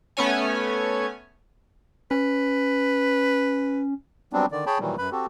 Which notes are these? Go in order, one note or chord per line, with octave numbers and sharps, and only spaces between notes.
A3 B3 C#4 C#5 G#5
C#4 B4
F#3 G3 B3 C4 D4
D3 D#3 D5
G#4 C#5 G5 A5 B5
A#2 D#3 E3 F#3 G3
F#2 B4 B5
C4 F#4 G4 A4